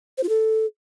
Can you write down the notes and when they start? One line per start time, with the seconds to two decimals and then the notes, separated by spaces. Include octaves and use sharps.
0.18 C5
0.23 F4
0.29 A4